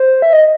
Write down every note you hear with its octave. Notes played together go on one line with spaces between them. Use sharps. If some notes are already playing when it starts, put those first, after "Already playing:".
Already playing: C5
E5
D#5